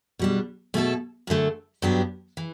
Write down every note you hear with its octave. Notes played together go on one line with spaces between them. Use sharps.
B2 G3 D4
B2 A3 E4 A4
F#2 D3 A3
G2 F#3 B3 D4 G4
E3